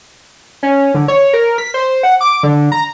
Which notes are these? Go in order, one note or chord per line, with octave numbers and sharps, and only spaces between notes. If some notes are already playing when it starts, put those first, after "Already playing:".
C#4
D3
C#5
A#4
B6
C5
F#5
D6
D3
A#5